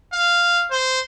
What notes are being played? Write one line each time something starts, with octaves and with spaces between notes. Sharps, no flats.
F5
C5